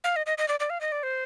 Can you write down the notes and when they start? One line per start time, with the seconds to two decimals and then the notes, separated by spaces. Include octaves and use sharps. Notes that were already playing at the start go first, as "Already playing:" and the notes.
0.04 F5
0.16 D#5
0.26 D#5
0.38 D#5
0.48 D5
0.60 D5
0.70 F5
0.81 D#5
0.92 D5
1.03 C5